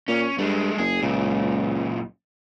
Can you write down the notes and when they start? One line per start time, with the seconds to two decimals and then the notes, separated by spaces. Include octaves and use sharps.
0.08 A#2 C#4
0.38 G2 G#3 A3
0.78 F#1 G#4
1.02 C#2 F#2 A#2